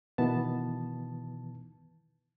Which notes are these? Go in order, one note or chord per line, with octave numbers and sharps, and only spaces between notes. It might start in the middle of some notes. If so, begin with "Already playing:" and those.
B2 D#3 E3 B3 A5